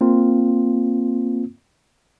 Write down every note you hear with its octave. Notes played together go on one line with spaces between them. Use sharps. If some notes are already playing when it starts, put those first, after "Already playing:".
A#3 C4 F4